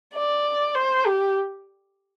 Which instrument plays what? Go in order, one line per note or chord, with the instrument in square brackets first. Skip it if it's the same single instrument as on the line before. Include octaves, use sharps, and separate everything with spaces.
[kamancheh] D5
C5
G4